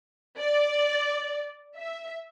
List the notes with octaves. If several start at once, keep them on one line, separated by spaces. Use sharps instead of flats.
D5
E5